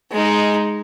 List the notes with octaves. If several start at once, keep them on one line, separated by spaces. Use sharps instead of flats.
G#3 D#4